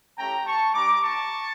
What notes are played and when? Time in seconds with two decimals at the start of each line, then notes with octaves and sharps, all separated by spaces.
0.18 A3 C#4 E4 G4 G5 A#5
0.46 A5 C#6
0.73 G3 D4 G4 A#5 D6
1.01 A5 C#6